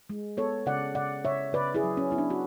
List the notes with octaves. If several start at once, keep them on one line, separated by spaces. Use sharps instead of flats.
G#3
B3 A4 C#5
C#3 D5 F#5
C#3 D5 F#5
C#3 C#5 E5
C#3 B4 D5
E4 G#4
F#3
C#4
B3 E4
D4
F#4